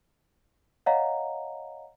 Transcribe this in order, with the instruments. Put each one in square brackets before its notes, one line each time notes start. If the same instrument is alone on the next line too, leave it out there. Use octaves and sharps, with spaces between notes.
[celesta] C#5 D#5 F5 F#5 A#5